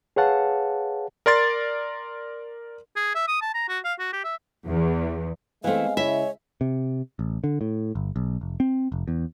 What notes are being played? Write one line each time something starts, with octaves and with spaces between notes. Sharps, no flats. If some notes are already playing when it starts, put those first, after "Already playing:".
G#4 B4 C#5 F5 F#5 A5
A#4 D5 C6 A6
G#4
E5
D#6
A5
A#5
F#4
F5
F#4
G4
E5
E2
E3 G#3 A3 B3 C4 F5
C#3 E4 C#5 E5
C3
A1
D3
A2
G1
B1
F1
C4
F1
E2